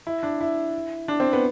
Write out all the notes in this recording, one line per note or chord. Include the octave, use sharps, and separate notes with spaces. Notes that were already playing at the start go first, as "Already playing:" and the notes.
E4
D4
E4
D4
C4
B3